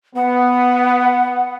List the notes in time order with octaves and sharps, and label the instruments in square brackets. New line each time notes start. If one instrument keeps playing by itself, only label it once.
[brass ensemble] B3 [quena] F#5